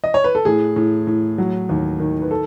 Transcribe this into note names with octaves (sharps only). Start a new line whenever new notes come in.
D#5
C#5
B4
A4
A2 G#4
A2
A2
F#3
D#2
D#3
B4
A4